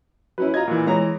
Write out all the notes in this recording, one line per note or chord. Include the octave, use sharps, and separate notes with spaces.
F#3 C#4 E4 B4
F4 D#5 A#5 G#6
A#2 E3
E3 G#3 C#5 A#5